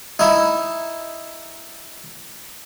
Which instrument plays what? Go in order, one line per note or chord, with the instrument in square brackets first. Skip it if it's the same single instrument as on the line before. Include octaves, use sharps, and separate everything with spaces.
[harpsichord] D#4 E4